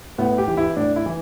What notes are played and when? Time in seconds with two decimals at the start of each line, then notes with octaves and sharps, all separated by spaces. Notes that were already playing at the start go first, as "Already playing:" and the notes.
0.18 A2 B3
0.38 G4
0.48 E3
0.57 E4
0.77 A2 D4
0.96 E4
1.06 E3